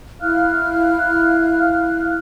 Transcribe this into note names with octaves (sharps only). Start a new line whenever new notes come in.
E4 F5 F6 F#6